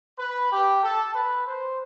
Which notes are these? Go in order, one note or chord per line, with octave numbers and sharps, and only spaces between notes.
B4
G4
A4
B4
C5